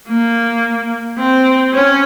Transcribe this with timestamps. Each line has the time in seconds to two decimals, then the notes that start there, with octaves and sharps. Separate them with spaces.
0.08 A#3
1.18 C4
1.73 C#4